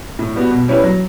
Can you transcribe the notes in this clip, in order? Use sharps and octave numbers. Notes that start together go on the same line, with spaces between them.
A2
G3 B3 F#4
B2
G3 C#4 E4 B4
F#3